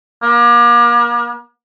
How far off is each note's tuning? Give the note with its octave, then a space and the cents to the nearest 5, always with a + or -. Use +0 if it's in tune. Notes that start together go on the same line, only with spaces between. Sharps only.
A#3 +40